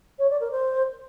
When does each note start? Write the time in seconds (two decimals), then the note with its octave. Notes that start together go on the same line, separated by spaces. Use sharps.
0.18 C#5
0.29 D5
0.40 A#4
0.51 C5